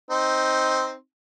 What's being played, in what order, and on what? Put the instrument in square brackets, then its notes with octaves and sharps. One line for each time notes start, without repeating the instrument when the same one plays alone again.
[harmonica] C4 D#4